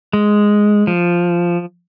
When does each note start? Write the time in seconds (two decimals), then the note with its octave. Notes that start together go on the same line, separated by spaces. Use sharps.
0.13 G#3
0.87 F3